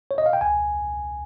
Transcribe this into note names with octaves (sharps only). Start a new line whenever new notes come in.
C#5
D#5
F5
G5
C#2 G#5